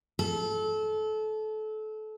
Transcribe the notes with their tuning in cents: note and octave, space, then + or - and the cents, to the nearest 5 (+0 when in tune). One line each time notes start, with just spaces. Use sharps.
A4 -25